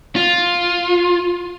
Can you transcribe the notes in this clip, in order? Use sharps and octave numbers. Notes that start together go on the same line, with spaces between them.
F4